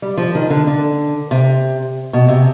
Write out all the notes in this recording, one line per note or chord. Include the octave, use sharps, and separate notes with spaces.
G3
F3
D#3
D3
D3
C3
B2
C3